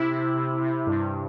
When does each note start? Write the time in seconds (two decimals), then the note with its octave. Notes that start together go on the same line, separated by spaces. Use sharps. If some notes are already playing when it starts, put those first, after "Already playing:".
Already playing: C3 E4
0.11 C3
0.36 C3
0.61 C3
0.87 G2